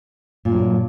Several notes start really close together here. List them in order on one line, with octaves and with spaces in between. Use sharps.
A#2 G2 F#3